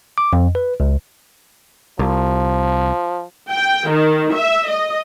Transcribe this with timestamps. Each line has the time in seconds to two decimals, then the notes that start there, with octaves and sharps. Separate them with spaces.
0.18 D6
0.33 F2
0.55 B4
0.80 C#2
1.99 C2 F3
3.51 G5
3.90 D#3
4.34 E5
4.69 D#5